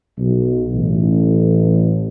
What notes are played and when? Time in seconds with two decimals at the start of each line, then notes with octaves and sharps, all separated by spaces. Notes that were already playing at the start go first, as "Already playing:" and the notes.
0.18 B1
0.74 A1